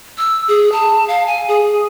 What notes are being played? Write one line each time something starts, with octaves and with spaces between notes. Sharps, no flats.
E6
G#4
A5
F5
G#5
G#4